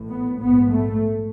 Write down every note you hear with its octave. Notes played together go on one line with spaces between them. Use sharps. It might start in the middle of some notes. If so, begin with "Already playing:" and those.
Already playing: A1 A2
B3
A#1 G#2 B3
A3